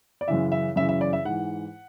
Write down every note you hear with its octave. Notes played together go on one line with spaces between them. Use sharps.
D5
F#2 C#3 E3 E5
E5
F#2 C#3 E3 E5
E5
D5
E5
G#2 E3 F#5